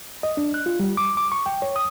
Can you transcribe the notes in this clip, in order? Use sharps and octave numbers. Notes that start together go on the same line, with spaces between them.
D#5
D4
F#6
F4
G3
D6
D6
C#6
G5
C#5
D#6